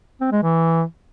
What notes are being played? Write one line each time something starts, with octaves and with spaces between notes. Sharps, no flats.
C4
G#3
E3